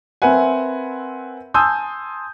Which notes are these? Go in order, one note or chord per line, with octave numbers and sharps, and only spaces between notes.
C4 A#4 B4 E5 F#5 G#5
G#5 A5 C6 D#6 E6 G6